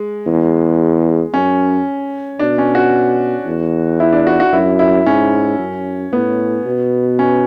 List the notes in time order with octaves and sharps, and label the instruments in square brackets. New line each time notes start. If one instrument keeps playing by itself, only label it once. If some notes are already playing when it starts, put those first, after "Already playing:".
Already playing: [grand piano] G#3
[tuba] E2
[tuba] F#2 [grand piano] C#4
[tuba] B2 [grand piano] D4
[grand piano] C#4
F#4
[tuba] E2
[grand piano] E4
D4
F#4
F#4
[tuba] F#2 [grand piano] E4
[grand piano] E4
[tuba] G#2 [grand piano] C#4
[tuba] F#2
[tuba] A2 [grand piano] B3
[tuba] B2
[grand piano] C#4